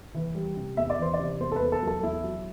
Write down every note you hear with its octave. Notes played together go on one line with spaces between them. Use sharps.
E3
G3
C3
E2 E5
D5
E3 C5
D5
C3
E2 C5
A4
B4
E2
A4
F#3 A4
E2 E4
F#3